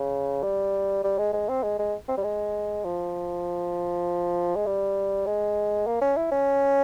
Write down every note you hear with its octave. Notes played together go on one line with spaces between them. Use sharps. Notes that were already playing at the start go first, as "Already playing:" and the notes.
Already playing: C#3
G3
G3
G#3
G#3
C4
G#3
G#3
C4
G3
G#3
F3
G#3
G3
G#3
A#3
C#4
E4
C#4